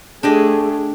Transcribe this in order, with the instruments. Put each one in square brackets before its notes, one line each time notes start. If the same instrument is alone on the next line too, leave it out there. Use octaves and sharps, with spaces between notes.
[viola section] A3 G#4 [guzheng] D4 G4 D#5